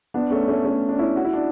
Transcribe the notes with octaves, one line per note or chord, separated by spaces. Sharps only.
B3 D4
A3 C#4
A3 C#4
A3 C#4
D4
C#4 E4
F#4
E4
D4